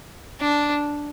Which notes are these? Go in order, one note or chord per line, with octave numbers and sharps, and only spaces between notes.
D4